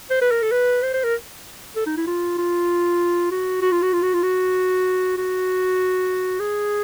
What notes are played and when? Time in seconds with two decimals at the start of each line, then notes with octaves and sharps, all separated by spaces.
0.10 C5
0.22 B4
0.31 A#4
0.42 A4
0.52 B4
0.83 C5
0.94 C5
1.04 A#4
1.76 A4
1.86 D#4
1.97 E4
2.07 F4
2.38 F4
3.31 F#4
3.62 F#4
3.72 F4
3.83 F#4
3.93 F4
4.02 F#4
4.14 F4
4.23 F#4
5.17 F#4
6.40 G#4